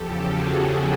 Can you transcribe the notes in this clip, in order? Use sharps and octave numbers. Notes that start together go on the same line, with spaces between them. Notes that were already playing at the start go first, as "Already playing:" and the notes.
Already playing: E2 C#3 F3 G4 A4
F#4 G#4